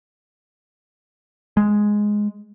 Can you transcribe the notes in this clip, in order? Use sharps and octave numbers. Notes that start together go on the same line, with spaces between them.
G#3